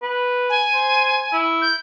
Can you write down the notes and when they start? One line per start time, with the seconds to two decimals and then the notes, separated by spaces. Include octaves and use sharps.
0.02 B4
0.50 G#5
0.74 C5
1.33 E4
1.62 G6